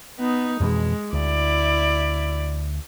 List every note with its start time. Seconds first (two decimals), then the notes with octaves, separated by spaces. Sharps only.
0.19 B3 D#4
0.60 F2 B2 E3 G#3
1.13 D2 E4 D5